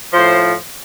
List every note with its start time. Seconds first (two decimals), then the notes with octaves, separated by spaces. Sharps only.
0.12 A2 F3 C5